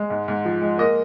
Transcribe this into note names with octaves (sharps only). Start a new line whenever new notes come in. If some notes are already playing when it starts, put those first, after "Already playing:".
Already playing: G#3
G#2
G#2
F3
G#3
A#3 D#5